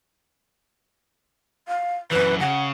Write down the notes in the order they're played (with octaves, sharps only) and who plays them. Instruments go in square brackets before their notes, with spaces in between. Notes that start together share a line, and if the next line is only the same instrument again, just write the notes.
[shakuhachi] F5
[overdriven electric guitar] F#2 E3 [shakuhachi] B4
[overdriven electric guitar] C#3 [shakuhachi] F#5